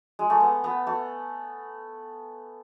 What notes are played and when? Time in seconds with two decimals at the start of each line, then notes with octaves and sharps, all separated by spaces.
0.19 G#3
0.30 A3
0.40 B3
0.64 B3
0.87 A3